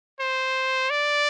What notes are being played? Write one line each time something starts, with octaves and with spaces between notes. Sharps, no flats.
C5
D5